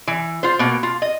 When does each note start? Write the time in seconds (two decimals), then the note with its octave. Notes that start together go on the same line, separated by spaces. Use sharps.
0.07 E3
0.43 F4 C5
0.59 B2 A#3
0.83 F4
1.02 D#5